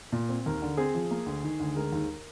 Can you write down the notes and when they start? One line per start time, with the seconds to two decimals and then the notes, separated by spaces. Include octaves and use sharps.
0.12 A#2
0.29 C4
0.46 D#2 A#4
0.62 D3
0.77 C4 G#4
0.95 F3
1.11 A#3
1.26 D2
1.44 D#3
1.60 D2
1.76 G#3 A#4
1.92 D#2